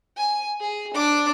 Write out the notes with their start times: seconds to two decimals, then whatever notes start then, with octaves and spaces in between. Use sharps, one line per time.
0.17 G#5
0.60 G#4
0.94 D4 D6